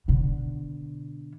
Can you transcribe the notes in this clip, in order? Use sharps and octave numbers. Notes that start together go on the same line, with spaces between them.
B2 D3